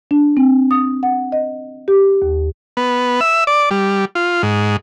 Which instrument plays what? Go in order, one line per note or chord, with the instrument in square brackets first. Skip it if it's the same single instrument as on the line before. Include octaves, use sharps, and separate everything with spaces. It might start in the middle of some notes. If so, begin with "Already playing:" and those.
[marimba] D4
C4
D#6
F#5
D#5
G4
D#2
[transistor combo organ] B3
E5
D5
G3
F4
G#2